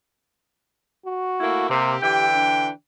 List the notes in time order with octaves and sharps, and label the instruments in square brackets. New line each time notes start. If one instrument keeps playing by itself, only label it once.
[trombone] F#4
[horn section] A3 A#3 E4
[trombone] C3 [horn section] A#3 C4 G4
[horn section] D3 E3 G5 [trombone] G4
[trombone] D4